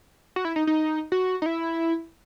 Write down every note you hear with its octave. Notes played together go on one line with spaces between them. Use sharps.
F#4
E4
D#4
D#4
F#4
D#4
E4